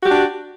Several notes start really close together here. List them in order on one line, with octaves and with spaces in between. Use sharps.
F#4 G4 D4